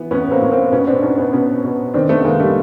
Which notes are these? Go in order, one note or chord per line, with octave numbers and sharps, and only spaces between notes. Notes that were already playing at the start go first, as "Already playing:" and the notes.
Already playing: E3 B3
A2 B3 C#4
A#3 C4
A2
A#3 C4
B2 B3 C#4
C4 D4
B2 C#4 D#4
B3 C#4
B2 B3 C#4
B2
D#3 C4 D4
A3 B3
D#3 G#3 A#3
G3 A3